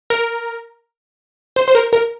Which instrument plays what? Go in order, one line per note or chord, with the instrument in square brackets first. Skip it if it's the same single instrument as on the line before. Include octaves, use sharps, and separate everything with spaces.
[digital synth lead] A#4
C5
C5
A#4
A#4